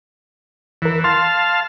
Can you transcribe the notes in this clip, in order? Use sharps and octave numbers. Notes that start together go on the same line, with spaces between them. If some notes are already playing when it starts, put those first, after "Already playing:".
E2 E3 A#4
F5 A5 C6